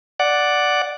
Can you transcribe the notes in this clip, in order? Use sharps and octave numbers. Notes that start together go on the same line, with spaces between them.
D5 F#5